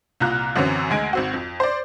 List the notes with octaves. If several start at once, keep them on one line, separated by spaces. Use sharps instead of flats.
C2 A#2 F4 A#5 F#6
F#2 D3 E3 F#3 C4 C#4
D2 G#3 G#5 D7
G#1 C4 F#4
F2
C5 D5